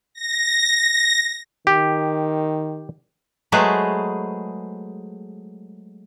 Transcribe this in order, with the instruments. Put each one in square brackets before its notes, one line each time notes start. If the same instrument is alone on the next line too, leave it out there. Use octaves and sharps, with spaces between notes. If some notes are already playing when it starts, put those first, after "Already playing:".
[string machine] A#6
[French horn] D#3 [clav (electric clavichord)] G4
[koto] F#3 G#3 A3 G#4 B4 C5